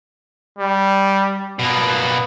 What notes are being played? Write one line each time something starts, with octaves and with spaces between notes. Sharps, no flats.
G3
B2 A#3 B3